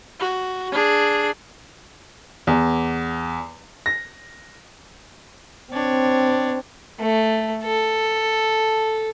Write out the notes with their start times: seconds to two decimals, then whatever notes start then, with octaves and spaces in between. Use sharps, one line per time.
0.19 F#4
0.72 D4 G#4
2.47 E2
3.86 A#6
5.72 C4 D4 C#5
7.00 A3
7.63 A4